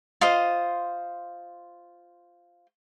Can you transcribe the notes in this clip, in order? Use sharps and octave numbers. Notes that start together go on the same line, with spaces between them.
F4 C5 D#5